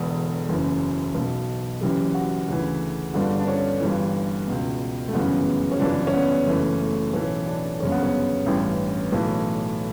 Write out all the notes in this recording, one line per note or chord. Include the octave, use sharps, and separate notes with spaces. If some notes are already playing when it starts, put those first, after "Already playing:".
Already playing: E1 E2 D3
F#1 F#2 E3
B1 B2
F#1 F#2 E3 G4
F#4
D2 C#3 E3
G1 G2 D3 D4
D4
C#4
G1 G2 E3
C#2 B2
A3
G1 F#2 C#3 E3 B3
C#4
G1 F#2 C#3 E3 D4
C#4
B3
F#1 F#2 E3 A3
A3
B1 A2 E3 C#4
D4
G1 F#2 C#3 C#4
B3
C#4
A1 G2 E3
B1 A2 E3